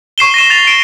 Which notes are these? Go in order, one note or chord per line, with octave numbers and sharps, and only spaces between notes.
C#6 C7 E7 G7
A#6 D#7 E7
A6 F7
D7 E7